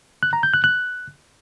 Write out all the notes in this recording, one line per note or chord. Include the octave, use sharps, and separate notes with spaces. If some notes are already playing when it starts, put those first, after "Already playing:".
F#6
A#5
G6
F#6
F#6